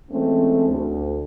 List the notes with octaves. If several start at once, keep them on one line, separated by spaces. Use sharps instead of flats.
E3 G#3 A3 C4 C#4
D2